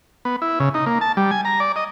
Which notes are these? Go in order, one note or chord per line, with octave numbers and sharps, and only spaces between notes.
B3
E4
C#3
D#4
A#3
A5
G3
G#5
A#5
D5
D#5